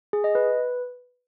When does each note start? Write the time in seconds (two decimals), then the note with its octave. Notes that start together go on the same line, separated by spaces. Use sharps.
0.13 G#4
0.24 D#5
0.35 B4